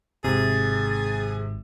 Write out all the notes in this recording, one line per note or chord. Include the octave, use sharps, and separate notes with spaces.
G#1 G#2 C3 G#4 A6